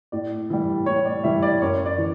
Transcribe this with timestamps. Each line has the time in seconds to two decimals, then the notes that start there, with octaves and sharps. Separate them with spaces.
0.12 A2 D5
0.50 E3 G3
0.86 A2 C#5
1.05 D5
1.24 E3 G3 E5
1.43 D5
1.62 F#2 C#5
1.86 D5
1.98 E3